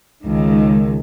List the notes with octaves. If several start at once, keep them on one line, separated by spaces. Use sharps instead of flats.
C#2 D#3